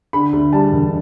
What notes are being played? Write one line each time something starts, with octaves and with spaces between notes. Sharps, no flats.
D3 B5
D2
G3 A5
E1